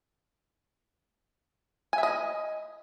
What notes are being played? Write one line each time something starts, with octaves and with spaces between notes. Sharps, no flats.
G#5
E5
D#5